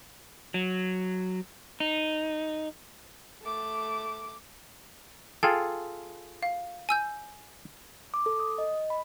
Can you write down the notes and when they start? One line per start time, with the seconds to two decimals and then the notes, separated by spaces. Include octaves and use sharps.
0.54 F#3
1.80 D#4
3.42 A3 D6
5.43 F4 G#4 A4 G5
6.43 F5
6.89 G#5 E6 G6
8.14 D6
8.26 A4
8.40 D#6
8.58 D#5
8.90 B5